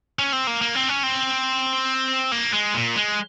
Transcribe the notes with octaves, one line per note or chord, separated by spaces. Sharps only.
C#4
C4
A#3
A#3
C4
C#4
C4
A#3
G#3
A#2
G#3